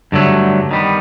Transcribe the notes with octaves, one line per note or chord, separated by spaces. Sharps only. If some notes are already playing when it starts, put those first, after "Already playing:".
G2 D3 F#3 A3
D#3 G3 B3